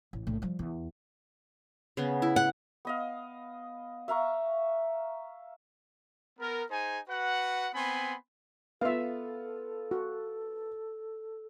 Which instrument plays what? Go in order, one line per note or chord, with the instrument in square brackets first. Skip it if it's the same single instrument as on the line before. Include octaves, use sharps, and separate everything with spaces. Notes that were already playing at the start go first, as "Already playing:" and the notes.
[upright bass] A1
A#1 A2
F3 G3
E2
[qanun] C#3 B3
E4
[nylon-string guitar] F#5
[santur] B3 D#5 F5
E5 F5 A#5 C#6
[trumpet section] B3 A#4
D#4 G#4 C5 G#5
F#4 B4 F#5
B3 C4 G#5 B5 C6
[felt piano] B3 F4 [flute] A4 [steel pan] E5 F5
[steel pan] F#4